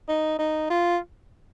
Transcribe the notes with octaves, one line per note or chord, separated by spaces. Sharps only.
D#4
D#4
F4